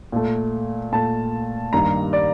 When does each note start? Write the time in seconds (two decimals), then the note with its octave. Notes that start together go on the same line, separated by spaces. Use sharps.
0.12 A#2 A3
0.92 A#2 A3 A5
1.73 G2 D#3 G3 A#3 A#5
2.13 D5